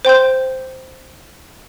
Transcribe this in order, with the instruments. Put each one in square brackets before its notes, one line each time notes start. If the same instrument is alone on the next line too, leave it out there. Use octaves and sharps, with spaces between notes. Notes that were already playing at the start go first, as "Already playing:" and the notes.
[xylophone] C5 G5 C6 G6